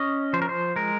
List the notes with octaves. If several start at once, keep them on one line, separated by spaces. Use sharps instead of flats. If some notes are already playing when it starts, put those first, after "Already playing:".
Already playing: C#4 D#5
F3 C5
A#4
C5
G#3 A#4